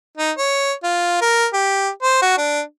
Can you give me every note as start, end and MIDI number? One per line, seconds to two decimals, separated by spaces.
0.17 0.31 63
0.38 0.72 73
0.84 1.20 65
1.21 1.47 70
1.53 1.89 67
2.02 2.20 72
2.22 2.37 66
2.38 2.61 62